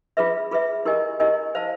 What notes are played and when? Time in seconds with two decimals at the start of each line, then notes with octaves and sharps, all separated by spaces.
0.17 F4 G#4 B4 E5
0.51 F4 G#4 B4 E5
0.85 E4 G4 A#4 D#5 G#5
1.20 E4 G4 A#4 D#5 G#5
1.55 C5 F5 A5